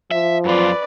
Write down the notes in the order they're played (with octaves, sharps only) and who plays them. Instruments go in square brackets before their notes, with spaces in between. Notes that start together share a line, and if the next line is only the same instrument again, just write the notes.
[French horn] F3 [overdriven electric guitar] E5
[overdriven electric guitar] F#2 F4 [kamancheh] B4 D5